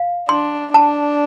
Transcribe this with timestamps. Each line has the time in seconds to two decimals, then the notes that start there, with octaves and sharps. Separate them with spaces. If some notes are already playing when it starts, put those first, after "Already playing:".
Already playing: F5
0.29 D4 C6
0.74 D4 A5